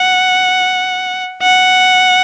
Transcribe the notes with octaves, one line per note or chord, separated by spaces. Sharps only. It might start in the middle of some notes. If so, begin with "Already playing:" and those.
Already playing: F#5
F#5